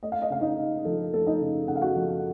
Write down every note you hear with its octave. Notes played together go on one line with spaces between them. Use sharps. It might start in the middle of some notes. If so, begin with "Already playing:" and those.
A3 D#5
F5
D#5
C#3 F5
D#4 D#5
C#3
F3 A4
A3 A4
D#4 D#5
C#3
C#3 F#5
F5
F#4 F#5
F3